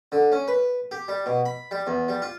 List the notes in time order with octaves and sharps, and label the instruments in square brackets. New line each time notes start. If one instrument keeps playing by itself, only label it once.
[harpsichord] D3
C#4
B4
G4
G3
B2
B5
G3
E2
G3
F4